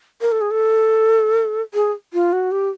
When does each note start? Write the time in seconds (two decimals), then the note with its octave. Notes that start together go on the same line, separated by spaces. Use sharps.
0.21 A#4
0.32 A4
0.41 G#4
0.51 A4
1.74 G#4
2.14 F4
2.33 F#4
2.52 G4